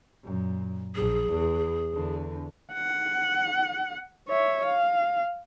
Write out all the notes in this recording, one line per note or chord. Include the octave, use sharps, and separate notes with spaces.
F#2 A#2
A#1 G#4
E2
E2 D3
F#5
C#5 E5
F5